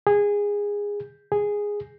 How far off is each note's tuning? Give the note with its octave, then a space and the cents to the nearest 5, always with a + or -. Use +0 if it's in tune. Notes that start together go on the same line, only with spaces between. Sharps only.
G#4 -15
G#4 -5